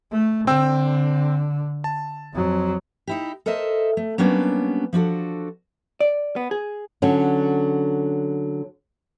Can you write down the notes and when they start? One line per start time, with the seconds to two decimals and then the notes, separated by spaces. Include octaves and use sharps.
0.11 A3
0.47 D3 C4 G5 E6
1.84 A5
2.34 F2 F#3
3.07 D#4 E4 G4
3.46 A4 A#4 C5 D#5 E5
3.97 A3
4.18 F#3 G3 A#3 B3 C#4 D4
4.93 F3 D4 F#4 A4
6.00 D5
6.36 B3
6.51 G#4
7.02 D3 F#3 C#4